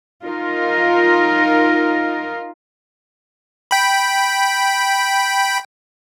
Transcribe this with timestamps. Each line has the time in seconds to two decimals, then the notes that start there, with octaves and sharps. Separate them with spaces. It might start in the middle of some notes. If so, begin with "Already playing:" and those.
0.24 D#4 F4 A#4
3.71 G5 B5